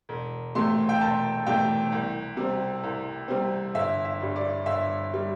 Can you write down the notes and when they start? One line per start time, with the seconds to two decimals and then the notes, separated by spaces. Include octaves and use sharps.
0.09 E1
0.55 E2 C3 A3 C6
0.89 G5
1.01 E1 A5
1.46 E2 C3 A3 G5
1.92 C2
2.37 C3 G3 C4
2.83 C2
3.28 C3 G3 C4
3.75 G1 E5
4.05 E5
4.20 G2 G3
4.36 D5
4.66 G1 E5
5.14 G3